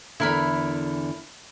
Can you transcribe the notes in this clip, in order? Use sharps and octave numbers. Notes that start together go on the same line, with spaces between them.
E2 D3 E4 A#4 B5